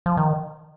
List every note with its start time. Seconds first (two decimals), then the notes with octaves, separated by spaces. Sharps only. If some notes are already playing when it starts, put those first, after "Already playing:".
0.06 F3
0.17 D#3